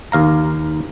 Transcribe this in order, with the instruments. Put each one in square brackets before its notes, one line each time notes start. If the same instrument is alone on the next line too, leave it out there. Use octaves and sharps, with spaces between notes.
[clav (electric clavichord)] D#2 F5 A#5